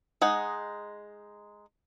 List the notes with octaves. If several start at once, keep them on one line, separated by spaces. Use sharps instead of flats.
G#3 D#4 F#5